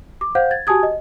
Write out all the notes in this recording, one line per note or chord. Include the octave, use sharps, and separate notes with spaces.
D6
C5 F5 F#5 G6
G#6 A6
F#4 G4 G#5 A5 D#6 G#6
D#5